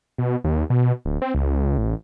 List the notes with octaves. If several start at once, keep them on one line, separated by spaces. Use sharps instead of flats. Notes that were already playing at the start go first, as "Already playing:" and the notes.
B2
D#2
B2
D1
C4
C#2
A1